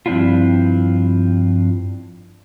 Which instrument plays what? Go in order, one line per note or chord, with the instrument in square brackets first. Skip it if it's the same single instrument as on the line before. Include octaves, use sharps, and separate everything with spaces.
[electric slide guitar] G2 F3 C4 D4 E4 F4